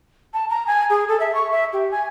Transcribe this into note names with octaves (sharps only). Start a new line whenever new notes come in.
A5
A#5
G#5
G#4
A4
E5
C#6
E5
G4
G#5